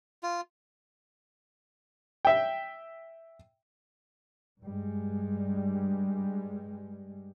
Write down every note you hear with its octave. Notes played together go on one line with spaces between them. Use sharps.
F4
E5 G5
G2 G3 G#3